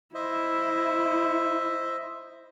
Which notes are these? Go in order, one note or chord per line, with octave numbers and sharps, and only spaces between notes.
E4 C5 D#5 E5